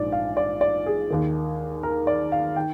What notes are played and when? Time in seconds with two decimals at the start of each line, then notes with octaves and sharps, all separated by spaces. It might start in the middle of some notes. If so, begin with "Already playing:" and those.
Already playing: A#1 G#2 F3 D5
0.12 F5
0.37 D5
0.61 D5
0.86 G#4
1.10 D#2 D#3
1.83 A#4
2.07 D5
2.32 F5
2.56 D#3 G5